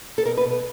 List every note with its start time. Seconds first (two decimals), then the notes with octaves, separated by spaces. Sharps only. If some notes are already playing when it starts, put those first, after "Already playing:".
0.18 A4
0.25 B2 A#4
0.37 B4
0.44 B2
0.50 B4